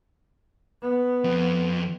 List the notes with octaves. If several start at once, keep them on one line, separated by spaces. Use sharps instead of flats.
B3
F2